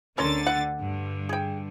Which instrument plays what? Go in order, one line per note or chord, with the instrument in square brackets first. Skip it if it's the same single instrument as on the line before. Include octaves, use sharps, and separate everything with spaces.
[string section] D2 D3 A6 [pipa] C#4 A#4 C6
[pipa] F#5
[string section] G2 D3
[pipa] G#4 G5